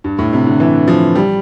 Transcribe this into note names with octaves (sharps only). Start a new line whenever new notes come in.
G2
A2
C3
D3
E3
F3
G3